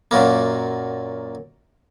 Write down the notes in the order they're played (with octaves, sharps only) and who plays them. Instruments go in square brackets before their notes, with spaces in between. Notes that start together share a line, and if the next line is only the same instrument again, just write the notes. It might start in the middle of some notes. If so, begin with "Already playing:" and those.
[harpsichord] F#2 A#2 F#3 A#3